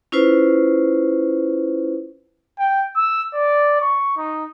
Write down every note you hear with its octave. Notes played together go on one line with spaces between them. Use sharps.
C#4 E4 F4 B4 C5
G5
E6
D5
C#6
D#4